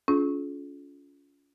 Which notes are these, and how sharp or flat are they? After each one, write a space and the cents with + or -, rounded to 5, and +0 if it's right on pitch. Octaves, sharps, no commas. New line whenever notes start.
C#4 +35 F4 +0 G#4 +40